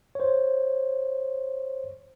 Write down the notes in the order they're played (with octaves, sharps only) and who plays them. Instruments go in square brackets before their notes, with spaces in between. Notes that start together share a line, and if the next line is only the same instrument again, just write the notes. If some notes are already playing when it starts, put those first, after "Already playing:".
[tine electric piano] C5 C#5